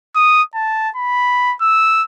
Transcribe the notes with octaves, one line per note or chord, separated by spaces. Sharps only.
D#6
A5
B5
E6